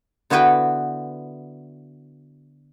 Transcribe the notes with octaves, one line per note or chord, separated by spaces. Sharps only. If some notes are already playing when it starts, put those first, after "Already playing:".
D3 B3 E4 F#4 B4 G5